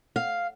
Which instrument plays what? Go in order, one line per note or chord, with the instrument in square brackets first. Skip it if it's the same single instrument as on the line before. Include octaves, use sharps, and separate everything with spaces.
[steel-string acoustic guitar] F5